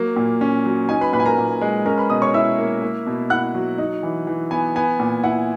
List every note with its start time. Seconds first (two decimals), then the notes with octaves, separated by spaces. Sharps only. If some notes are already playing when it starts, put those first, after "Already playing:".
Already playing: F#3 A#3
0.16 A#2
0.41 C#4
0.65 F#3
0.89 D#4 G#5
1.01 B4 B5
1.13 A#2 B4 B5
1.20 G#5
1.25 A#4 A#5
1.38 A#2
1.61 G#3
1.86 C#4 A#4 A#5
1.98 B4 B5
2.10 B2 D#5 D#6
2.22 C#5 C#6
2.34 E4 E5 E6
2.58 A#3
2.82 A#3
3.07 B2
3.30 E4 F#5 F#6
3.55 F#3
3.78 D#4
4.03 E3
4.27 E3
4.51 B3 G#5
4.76 B3 G#5
5.00 A#2
5.24 E4 F#5